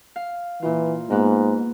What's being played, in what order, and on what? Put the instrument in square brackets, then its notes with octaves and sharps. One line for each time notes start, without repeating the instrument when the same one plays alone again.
[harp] F5
[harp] A#2 F4 [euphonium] E3
[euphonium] G#2 [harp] A#3 B3 B4